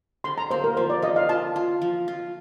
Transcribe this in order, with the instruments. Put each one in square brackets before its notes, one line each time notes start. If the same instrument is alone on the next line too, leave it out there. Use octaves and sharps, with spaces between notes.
[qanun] D3 [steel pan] C6
[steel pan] A#5
[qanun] A#3 [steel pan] C5
[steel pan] A#4
[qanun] F3 [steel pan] C5
[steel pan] D5
[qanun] F3 [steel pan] D#5
[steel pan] F5
[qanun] F4 [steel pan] A5
[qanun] F4
F3
F4